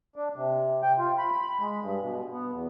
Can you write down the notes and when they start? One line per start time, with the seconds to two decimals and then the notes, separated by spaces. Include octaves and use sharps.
0.16 D4
0.36 C3
0.83 G5
0.98 F4
1.18 B5
1.32 B5
1.60 G#3
1.82 G2
2.02 B2
2.32 B3
2.52 E2